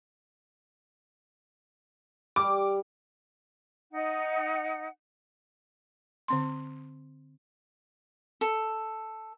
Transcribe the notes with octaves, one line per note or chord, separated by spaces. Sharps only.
G3 D6
D#4 F#5
D3 C4 C6
A4